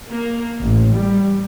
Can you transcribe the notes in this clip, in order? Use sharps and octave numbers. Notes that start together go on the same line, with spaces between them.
A#3
A1
G3